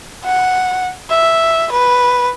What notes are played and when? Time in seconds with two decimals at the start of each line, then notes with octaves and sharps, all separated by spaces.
0.24 F#5
1.10 E5
1.72 B4